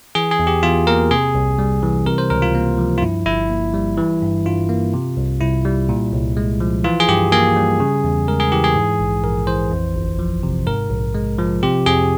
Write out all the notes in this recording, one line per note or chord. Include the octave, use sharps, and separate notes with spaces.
E3 G#4
G#4
E2
G4
E2 F4
A#3 A#4
C3 G#4
C2
G3
E3
C3 A#4
C5
C#2 A#4
F4
A#3
F3
F4
G2 E4
G1 E4
A#3
G3
E3
G2
G2 F4
A#3
C3
C2
C2 E4
G3
A#2
C2
G#3
F3
E3 F4
G#4
G2 G4
A#3 G#4
G3
C#3
E2
G#3 A#4
G#4
E3 G4
G#4
G#2
A#1
A#1 A#4
E3 C5
F2
G1
F3
C3
G#2 A#4
A#1
G#3
F3
C3 G4
F2 G#4